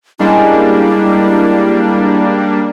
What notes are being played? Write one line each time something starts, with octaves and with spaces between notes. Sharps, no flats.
G3 G#3 A#3 C#4 D4 E4